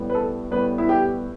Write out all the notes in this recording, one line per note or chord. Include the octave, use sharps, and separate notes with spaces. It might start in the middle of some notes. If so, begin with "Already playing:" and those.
Already playing: A2 G3 B3
B4
A4
A2 G3 B3 B4
E4
G4